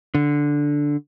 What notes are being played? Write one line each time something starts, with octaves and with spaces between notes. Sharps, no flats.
D3